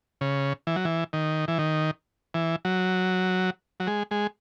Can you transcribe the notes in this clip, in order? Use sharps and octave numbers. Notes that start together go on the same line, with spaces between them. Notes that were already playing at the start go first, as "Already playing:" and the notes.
C#3
E3
F#3
E3
D#3
E3
D#3
E3
F#3
F#3
G#3
G#3